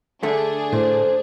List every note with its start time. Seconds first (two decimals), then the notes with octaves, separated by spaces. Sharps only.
0.23 D3 A3 D4 G#4
0.73 A2 C5